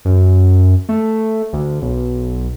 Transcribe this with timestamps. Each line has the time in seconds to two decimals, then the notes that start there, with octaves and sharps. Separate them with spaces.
0.05 F#2
0.89 A3
1.53 D2
1.82 B1